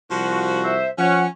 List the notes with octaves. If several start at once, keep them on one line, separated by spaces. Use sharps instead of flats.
C2 F3 F#4
C5 E5
F3 C#4 F#5